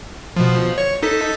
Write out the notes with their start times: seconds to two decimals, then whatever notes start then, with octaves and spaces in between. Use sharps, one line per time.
0.36 B2 F3
0.78 C#5
1.03 D#4 A4 B6